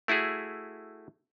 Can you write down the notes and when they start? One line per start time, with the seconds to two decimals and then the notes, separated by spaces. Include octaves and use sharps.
0.08 A3 E4 F#4 G#4